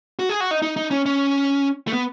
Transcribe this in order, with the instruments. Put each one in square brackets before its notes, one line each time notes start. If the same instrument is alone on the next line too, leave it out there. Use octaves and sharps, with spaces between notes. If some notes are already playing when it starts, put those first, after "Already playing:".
[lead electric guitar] F#4
G#4
F#4
D#4
D#4
D#4
C#4
C#4
A3
B3